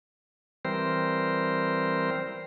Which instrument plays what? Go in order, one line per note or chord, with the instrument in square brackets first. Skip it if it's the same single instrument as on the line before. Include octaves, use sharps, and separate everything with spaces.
[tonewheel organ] E3 G3 C4 A#4 C5